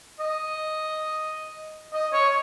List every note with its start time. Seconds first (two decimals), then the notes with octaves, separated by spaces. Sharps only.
0.20 D#5
1.93 D#5
2.13 C#5